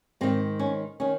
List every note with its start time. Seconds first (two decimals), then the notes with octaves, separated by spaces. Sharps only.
0.21 G#2 D#3 C4
0.59 C#4
1.00 D#3 C#4